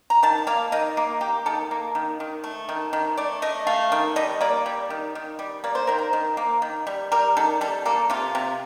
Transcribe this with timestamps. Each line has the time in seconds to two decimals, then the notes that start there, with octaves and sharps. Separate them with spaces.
0.10 A#5
0.23 D#3 A5
0.47 A#3 F5
0.72 D#3 D#5
0.97 A#3
1.21 A#3 G4
1.46 D#3 A4
1.71 A#3
1.95 D#3
2.20 D#3
2.44 A3
2.69 D#3
2.93 D#3
3.17 A3 D5
3.42 A3 D#5
3.67 A3 F5
3.92 D#3
4.16 G3 D#5
4.41 A#3 D5
4.66 G3
4.90 D#3
5.15 D#3
5.39 G3
5.64 A#3 D5
5.75 C5
5.87 D#3 A#4
5.98 C5
6.13 D#3
6.37 A#3
6.62 D#3
6.87 G3
7.12 G3 A#4
7.37 D#3 A4
7.61 G3 A4
7.85 A#3 A4
8.10 C3 F4
8.35 C3